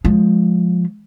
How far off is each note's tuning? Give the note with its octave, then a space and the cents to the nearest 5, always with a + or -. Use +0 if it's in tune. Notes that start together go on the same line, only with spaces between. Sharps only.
F3 +20 G#3 +10